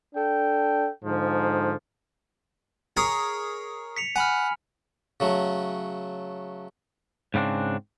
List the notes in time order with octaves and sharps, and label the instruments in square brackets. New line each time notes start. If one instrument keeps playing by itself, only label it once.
[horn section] D4 A4 G5
G#2 D3 F3
[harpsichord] G#4 A#4 C#5
[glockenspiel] B6 C#7 F7
[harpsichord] F#5 [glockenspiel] G#5 B5 F6
[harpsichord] C#3 F#3 A3
[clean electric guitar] G#2 C#3 B3 C4 D4